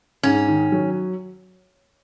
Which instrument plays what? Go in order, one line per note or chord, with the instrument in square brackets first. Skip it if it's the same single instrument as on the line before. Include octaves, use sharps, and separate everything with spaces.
[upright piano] G#2 [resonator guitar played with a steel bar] C#4
[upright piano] D#3
F#3